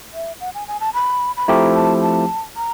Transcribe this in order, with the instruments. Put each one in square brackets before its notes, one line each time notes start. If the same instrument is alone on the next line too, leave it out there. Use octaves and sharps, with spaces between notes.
[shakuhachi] E5
F#5
G#5
G#5
A5
B5
B5
[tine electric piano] F3 A3 C4 E4 G4 [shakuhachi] A#5
[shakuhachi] A5
A5
A#5